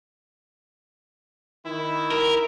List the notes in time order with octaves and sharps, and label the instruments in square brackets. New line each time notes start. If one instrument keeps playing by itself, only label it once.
[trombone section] D#3 E4
[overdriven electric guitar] A#4